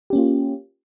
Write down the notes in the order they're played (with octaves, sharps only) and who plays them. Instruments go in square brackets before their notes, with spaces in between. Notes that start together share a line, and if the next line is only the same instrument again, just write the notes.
[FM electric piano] G4
C#4
A#3
F4